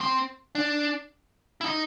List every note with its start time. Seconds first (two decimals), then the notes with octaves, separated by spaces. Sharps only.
0.01 C4
0.55 D4
1.61 E4
1.65 D#4